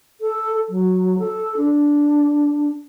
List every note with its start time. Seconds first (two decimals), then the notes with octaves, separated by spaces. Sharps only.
0.21 A4
0.69 F#3
1.19 A4
1.57 D4